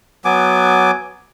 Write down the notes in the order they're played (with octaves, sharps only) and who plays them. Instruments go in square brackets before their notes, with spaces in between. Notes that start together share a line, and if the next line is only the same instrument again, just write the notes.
[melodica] F#3 B3 G#5 D6